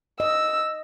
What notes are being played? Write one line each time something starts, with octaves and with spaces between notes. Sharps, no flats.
D#5 E6